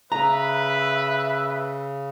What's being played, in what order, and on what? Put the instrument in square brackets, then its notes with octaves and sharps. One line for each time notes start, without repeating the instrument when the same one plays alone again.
[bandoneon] C#3 [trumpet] B4 [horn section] E5 [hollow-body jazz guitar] A#5